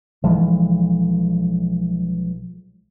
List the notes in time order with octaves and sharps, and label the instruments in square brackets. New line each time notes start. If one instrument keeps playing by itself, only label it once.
[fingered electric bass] B1 E3 F3 G#3